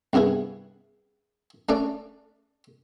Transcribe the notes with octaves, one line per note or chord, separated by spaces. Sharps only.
C2 G2 B3 E4 G#4
A3 C#4 D4 D5